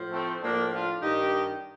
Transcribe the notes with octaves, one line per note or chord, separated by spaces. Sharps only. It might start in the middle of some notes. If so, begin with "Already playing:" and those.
Already playing: A2 F3
A3 C4
A2 F3 A#3 D4
D4 F4
G2 D#3 D#4 G4